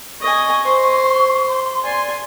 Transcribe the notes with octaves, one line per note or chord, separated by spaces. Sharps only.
D#5 G#5 C#6
C5
C6
D5 G#5 C6